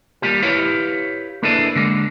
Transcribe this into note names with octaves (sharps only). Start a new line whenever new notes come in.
G3 A#3 F4 G4
E4 G4 B4 C#5 F5
A#3 D4 E4 G#4 A4 B4
D3 G#3 A#3